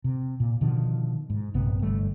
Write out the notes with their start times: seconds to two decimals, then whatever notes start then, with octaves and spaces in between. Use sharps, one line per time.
0.04 C3
0.40 A#2
0.61 B2 D3 D#3 F3
1.30 G#2
1.54 A#1 G2 C3 B3
1.82 G1 G3 A3